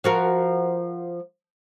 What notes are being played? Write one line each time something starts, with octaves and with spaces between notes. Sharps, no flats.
F3 F#4 A#4